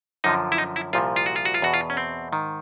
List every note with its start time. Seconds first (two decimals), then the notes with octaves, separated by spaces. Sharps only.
0.24 F#2 D3 F3 D#4
0.52 E4
0.58 D#4
0.76 E4
0.93 C2 A#2 F3 F4
1.16 F4
1.26 F#4
1.36 F4
1.45 F#4
1.54 F4
1.62 E2 B2 F#4
1.74 F4
1.90 C#4
1.97 C4
2.32 G#2 D#3